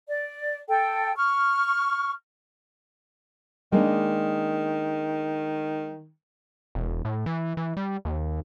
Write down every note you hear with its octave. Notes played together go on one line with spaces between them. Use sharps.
D5
A4 G5
C#6 F6
D#3 G#3 A#3 D4
E1
A2
E3
E3
G3
D#2